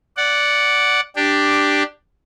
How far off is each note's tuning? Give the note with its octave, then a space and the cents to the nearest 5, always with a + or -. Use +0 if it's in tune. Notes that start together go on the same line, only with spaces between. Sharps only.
D5 -10 F#5 +0
D4 +5 G4 +0